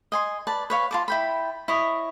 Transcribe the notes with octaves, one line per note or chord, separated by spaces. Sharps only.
D#5 G#5 C6
B4 D5 A5
B4 C#5 F5
F4 A5 D6
E4 G5 B5
E4 C#5 D#5